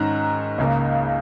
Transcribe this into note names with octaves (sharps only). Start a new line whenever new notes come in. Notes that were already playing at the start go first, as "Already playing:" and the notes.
Already playing: G#2 D#3 C#4 A#5 F#6
C#2 C#3 A#3